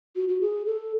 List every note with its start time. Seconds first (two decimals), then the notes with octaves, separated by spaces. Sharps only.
0.16 F#4
0.28 F#4
0.41 G#4
0.66 A4